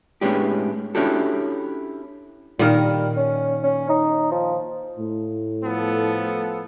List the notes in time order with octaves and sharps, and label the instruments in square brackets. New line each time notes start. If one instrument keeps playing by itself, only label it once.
[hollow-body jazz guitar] A2 G#3 B3 C#4 D4 G4
C#4 D4 E4 F#4 G4 A4
[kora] A#2 D#3 A#4 [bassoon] G3
[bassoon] C#4
C#4
D#4
F3
[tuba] A2
[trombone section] F3 B3 A4